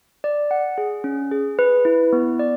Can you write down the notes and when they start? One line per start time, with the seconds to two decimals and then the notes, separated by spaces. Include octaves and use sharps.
0.24 D5
0.51 F#5
0.78 G#4
1.04 C#4
1.32 G#4
1.59 B4
1.85 E4
2.13 B3
2.40 D5